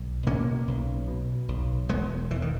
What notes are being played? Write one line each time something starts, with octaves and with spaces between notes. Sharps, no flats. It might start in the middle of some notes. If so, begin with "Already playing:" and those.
Already playing: B1
B2 A#3 C#4
B1
B2
B1
E1 G#3 B3
E1 E3
D#3